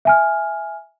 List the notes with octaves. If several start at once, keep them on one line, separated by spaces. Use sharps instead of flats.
E5 G#5 F6